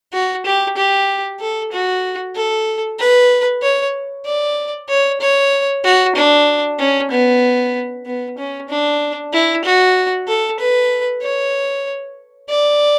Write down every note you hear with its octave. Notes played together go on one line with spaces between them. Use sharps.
F#4
G4
G4
A4
F#4
A4
B4
C#5
D5
C#5
C#5
F#4
D4
C#4
B3
B3
C#4
D4
E4
F#4
A4
B4
C#5
D5